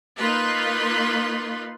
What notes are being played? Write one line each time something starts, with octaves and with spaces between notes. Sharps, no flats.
A#3 D#4 F4 B4 C6